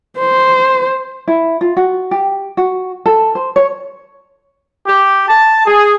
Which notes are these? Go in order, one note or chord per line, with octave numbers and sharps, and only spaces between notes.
C5
E4
F4
F#4
G4
F#4
A4
C5
C#5
G4
A5
G#4